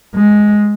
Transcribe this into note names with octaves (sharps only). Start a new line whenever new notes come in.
G#3